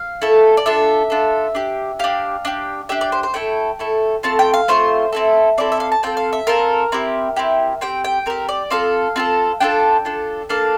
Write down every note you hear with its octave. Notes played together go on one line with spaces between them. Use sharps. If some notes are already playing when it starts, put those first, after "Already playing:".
Already playing: F5
A3 E4 A4
D5
D4 F4 A4 E5
D4 F4 A4
D4 G4
D4 G4 F5
D4 G4
D4 G4 E5
D5
C5
C5
A3 E4 A4 G5
A3 E4 A4
A3 C4 F4 A5
G5
F5
A3 C4 F4 C5
C4 E4 A4
C4 E4 A4 D5
E5
F5
A5
C4 F4 A4 G5
F5
E5
C4 F4 A4 A#4
C4 E4 G4
C4 E4 G4
C4 G4 G5
G5
C4 G4 A#4
D5
C4 F4 A4 F5
C4 F4 A4
D4 F4 A4 G5
D4 F4 A4
A#3 D4 A4 F5